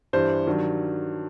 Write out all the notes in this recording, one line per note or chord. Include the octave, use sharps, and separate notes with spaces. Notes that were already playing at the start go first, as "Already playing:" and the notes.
G2 E3 G3 C5
G2 D#3 F#3